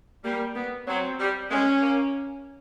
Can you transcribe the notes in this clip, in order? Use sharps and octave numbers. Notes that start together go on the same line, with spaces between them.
G3 A#3
B3
F#3 C4
G3
G#3 C#4
A#3